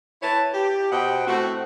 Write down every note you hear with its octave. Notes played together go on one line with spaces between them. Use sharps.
E4 B4 C#5 A5
G4
B2 C5 D#5 F#5 G5
A3 C4 E4 F#4